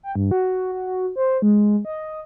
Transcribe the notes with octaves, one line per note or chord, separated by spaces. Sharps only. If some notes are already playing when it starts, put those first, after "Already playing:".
G5
G2
F#4
F#4
F#4
C5
G#3
D#5